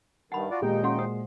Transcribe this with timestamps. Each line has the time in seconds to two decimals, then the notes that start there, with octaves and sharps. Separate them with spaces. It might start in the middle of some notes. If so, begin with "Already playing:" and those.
0.32 G2 D#3 F#5 A5 B5
0.51 F4 F#4 D5
0.62 D#2 A#2 G#3 D#4 G4 G5
0.84 C#4 F#4 F5 F#5
0.99 C5 D#6